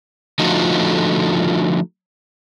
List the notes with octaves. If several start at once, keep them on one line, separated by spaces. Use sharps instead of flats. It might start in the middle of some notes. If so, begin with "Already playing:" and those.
D3 F3 A3 D#4 F4 F#4